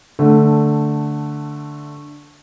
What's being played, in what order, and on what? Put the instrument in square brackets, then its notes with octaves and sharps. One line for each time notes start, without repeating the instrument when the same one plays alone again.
[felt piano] D3 A3